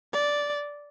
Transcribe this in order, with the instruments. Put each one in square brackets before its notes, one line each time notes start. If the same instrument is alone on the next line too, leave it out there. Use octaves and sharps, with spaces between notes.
[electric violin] D5